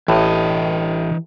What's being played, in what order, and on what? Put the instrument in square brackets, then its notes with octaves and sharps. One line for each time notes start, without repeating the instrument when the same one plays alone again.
[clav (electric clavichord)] A1 A2 [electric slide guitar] E3 D#5